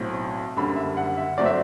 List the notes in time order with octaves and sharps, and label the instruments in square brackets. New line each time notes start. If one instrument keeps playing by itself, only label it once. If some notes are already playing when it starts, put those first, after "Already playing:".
Already playing: [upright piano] B1 A2 F#3 C4
F#1 F#2 D3 G3 B5
E5
F#5
E5
G1 F#3 A3 C4 D5
E5